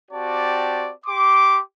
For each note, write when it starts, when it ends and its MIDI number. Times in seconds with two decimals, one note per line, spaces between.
0.11 0.91 60
0.11 0.91 66
0.11 0.91 67
0.11 0.91 74
0.11 0.91 81
1.06 1.60 67
1.06 1.60 84
1.06 1.60 86